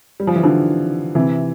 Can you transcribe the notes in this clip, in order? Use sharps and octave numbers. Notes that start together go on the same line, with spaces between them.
G3
F3
E3
D3 F3
C3 E3